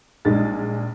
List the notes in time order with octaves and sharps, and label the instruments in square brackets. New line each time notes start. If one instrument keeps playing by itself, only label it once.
[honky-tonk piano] A#1 G3 G#3 D#4 A6